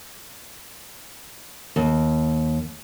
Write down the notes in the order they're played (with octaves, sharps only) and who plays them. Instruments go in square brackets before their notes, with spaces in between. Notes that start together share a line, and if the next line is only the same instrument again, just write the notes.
[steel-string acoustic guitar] D#2